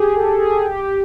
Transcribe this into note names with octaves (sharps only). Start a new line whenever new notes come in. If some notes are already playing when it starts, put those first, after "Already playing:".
Already playing: G4 G#4
A4
G#4
G4
G4